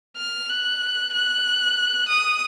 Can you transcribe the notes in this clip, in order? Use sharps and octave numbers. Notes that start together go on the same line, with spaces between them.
F6
F#6
F#6
D#6